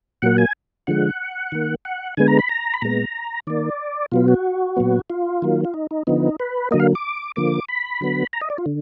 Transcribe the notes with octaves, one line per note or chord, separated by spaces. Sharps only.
A#2 F#3 A#3 F#5
G#5
D3 F3 G#3 F#5
D#3 A#3
F#5
D3 G#3 B3 G#5
A#5
B5
A#5
B5
A#2 G#3 B3 A#5
D#3 A#3 D5
B2 F#3 B3 F4
F#4
A#2 F#3 B3
F4
D#3 F#3 A#3
F4
D#4
D#4
D3 F3 B3 D#4
B4
D3 F#3 A#3 D#5
F5
D6
D3 F3 A#3 D6
B5
D3 F#3 B3
A#5
D#5
D5
F4
D3